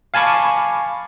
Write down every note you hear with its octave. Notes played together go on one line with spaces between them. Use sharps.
F5 G#5 A5 B5 C#6 D6